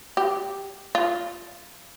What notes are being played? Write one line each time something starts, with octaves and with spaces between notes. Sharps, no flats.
G4
F4